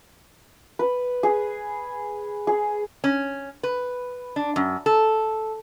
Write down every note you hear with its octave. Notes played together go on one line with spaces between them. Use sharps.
B4
G#4
G#4
C#4
B4
D4
F#2
A4